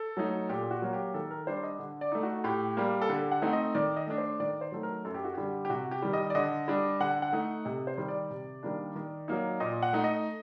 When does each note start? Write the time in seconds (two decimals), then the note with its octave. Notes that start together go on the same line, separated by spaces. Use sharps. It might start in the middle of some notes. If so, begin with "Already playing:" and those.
Already playing: A4
0.17 F#3 A3 D#4
0.49 A#2 G4
0.71 F#4
0.82 F#3 A#3
0.93 G4
1.14 D#3 A4
1.31 A#4
1.47 G3 D4 C5
1.63 D#5
1.79 D3
2.01 D5
2.12 A3 D#4
2.23 F#4
2.44 A2 G4
2.77 G3 A#3
3.02 A4
3.10 D3 G4
3.32 F#5
3.42 A3 C4 D#4
3.53 D#5
3.75 D#3 D5
3.96 D#5
4.07 A3 D4
4.18 C5
4.40 D#3 D5
4.61 C5
4.72 F#3 A3 D#4
4.83 A#4
5.05 F#2 A4
5.14 G4
5.25 F#4
5.34 D3 G3 G4
5.65 G4
5.70 C3 F#4
5.91 G4
6.02 D#3 G3
6.13 D#5
6.30 D5
6.35 D3 D#5
6.68 G3 D4
7.00 D3 F#5
7.22 F#5
7.33 A3 D#4
7.65 C3 D#5
7.87 C5
7.98 D#3 G3
8.08 D5
8.30 C3
8.63 D#3 G3 A#3 D4
8.95 D#3
9.28 F#3 A#3 D#4
9.60 A#2 D#5
9.83 F#5
9.93 A3 D#4
10.04 D#5